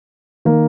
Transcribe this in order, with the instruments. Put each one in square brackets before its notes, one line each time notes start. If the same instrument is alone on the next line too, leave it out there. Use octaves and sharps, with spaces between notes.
[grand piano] D#3 A#3